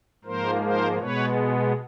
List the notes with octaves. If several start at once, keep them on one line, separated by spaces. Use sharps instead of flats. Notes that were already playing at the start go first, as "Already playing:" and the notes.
G#2 F3 A#3 A#4 C5
A#4 C5
B2 G#3 B3 B4 C#5